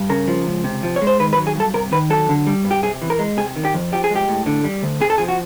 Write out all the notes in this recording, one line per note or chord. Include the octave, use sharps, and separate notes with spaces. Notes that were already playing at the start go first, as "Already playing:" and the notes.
Already playing: G2
C#3 A#4
F3
C#2
C3
F3
C#5
G#3
C5
D#3 B4
B4
F#3
G#4
G2 A4
C3 A#4
D#3 B4
F#3 A4
D3
G3
G2
G4
C3 G#4
E3
A#4
G#3
C3 G#4
D#3
G4
F2
F3 G4
G#4
G#3
G4
A2
D3
G3
D2
C3 G#4
A4
F3 G#4
F#4